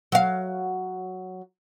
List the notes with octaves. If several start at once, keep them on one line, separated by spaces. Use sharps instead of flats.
F#3 F5